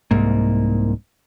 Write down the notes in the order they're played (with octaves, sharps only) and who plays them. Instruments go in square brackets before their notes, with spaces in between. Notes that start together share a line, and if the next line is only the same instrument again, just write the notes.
[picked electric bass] C2 G#2 A#3